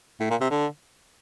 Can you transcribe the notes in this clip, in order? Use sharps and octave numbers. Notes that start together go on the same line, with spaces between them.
A2
A#2
C3
D3